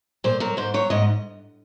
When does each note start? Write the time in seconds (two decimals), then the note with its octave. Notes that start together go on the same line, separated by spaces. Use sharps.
0.24 A#2 C5
0.40 F#3 A#4
0.57 G#2 C5
0.74 F#3 C#5
0.90 G#2 D#5